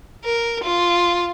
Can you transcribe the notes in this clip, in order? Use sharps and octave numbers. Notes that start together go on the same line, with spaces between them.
A#4
F4